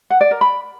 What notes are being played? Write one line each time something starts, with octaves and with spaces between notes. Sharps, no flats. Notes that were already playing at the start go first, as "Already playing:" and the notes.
F#5
D5
A#4
B5